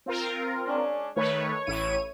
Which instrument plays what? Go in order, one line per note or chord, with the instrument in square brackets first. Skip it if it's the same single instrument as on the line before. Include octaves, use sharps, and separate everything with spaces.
[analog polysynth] C4 F4 A#4
[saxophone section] G#3 C#4 D4
[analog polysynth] D#3 A3 B4 [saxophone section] C#5
[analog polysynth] A1 E4 D#7